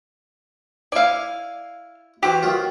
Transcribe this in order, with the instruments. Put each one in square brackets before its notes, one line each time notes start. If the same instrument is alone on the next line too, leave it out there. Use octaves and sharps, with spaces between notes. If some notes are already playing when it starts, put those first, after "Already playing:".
[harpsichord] E4 G#5 [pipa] D5 F5
[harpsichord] E3 F#4 C5 [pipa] G4
[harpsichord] D#3 F#3 F4